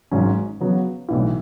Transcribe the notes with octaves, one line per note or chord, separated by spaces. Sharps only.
G#1 G#2 F#3 C#4
C#3 F#3 B3
B1 A2 E3